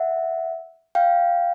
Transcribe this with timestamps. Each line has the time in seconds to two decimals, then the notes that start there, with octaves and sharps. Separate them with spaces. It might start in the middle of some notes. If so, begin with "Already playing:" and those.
Already playing: E5 F#5
0.95 F5 G5